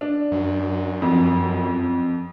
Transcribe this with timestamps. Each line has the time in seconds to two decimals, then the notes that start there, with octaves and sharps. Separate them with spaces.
0.01 D4
0.32 F#2
1.02 F2